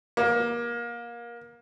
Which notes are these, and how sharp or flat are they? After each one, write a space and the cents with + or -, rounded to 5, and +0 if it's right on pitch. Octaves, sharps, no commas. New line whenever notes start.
A#3 +25